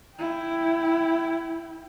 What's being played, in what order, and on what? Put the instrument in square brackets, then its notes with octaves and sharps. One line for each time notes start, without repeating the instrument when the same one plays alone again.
[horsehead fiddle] E4 G5